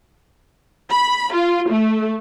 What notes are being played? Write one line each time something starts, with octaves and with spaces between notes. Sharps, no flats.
B5
F4
A3